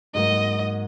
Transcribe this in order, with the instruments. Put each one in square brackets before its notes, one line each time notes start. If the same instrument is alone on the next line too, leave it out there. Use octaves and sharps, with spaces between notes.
[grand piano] G#2 F#3 A#3 [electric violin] D#5